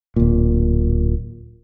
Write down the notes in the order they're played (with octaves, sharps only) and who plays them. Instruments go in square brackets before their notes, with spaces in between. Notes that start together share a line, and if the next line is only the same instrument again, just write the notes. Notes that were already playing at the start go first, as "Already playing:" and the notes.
[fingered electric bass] D1 A#2